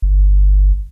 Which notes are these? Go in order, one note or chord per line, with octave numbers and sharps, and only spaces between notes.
G1